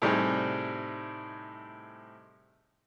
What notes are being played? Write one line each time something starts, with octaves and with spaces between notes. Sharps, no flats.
A2 C3 G3 C4 D#4 G#4